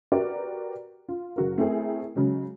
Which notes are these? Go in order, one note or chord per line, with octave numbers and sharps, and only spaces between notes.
F#4 G4 A#4 B4 D5
F4
F#1 F#4 A#4
A3 C4 E4 G#4 A#4
C#3 F#3 G#3 C#4